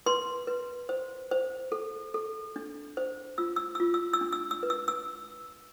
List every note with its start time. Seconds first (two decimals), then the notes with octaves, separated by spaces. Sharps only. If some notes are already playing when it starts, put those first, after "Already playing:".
0.06 B4 C6
0.47 B4
0.89 C5
1.31 C5
1.72 A4
2.14 A4
2.56 D4
2.97 C5
3.38 F4 E6
3.56 E6
3.75 E6
3.80 F4
3.94 E6
4.13 E6
4.21 D4
4.33 E6
4.51 E6
4.63 B4
4.70 E6
4.88 E6